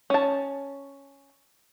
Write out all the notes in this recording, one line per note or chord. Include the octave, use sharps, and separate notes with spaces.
C#4 A5